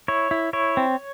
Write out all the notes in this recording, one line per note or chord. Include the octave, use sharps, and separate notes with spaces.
E4 C#5
E4
E4 C#5
C4